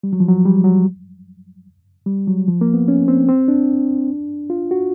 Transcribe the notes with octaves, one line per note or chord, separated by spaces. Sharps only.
G3
F#3
F3
F#3
G3
F#3
G3
F#3
F3
A#3
B3
C#4
C4
C4
D4
F4
F#4